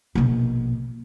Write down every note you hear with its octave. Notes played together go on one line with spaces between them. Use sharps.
A#1 B2